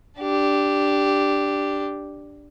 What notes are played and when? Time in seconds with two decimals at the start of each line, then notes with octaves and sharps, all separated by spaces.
0.20 D4 G4